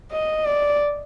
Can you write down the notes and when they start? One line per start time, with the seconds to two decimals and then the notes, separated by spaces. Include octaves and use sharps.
0.12 D#5
0.45 D5